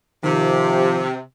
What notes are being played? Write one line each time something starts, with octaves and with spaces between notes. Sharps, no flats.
C3 D#3 F3 G4